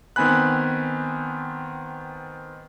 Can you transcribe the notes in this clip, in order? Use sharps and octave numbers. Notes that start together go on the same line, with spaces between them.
D#3 B3 C4 G#5 B5 F#6